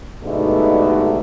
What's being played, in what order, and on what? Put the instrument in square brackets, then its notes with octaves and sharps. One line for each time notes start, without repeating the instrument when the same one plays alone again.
[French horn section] G2 B2 D3 G#3 A3 D#4